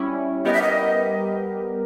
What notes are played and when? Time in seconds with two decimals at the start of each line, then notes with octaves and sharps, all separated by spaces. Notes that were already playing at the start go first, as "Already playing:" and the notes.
Already playing: G3 C#4 E4
0.45 G3 B3 G4 A#4 D#5
0.53 E5
0.62 D#5